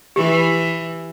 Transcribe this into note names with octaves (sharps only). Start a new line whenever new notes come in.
E3 G4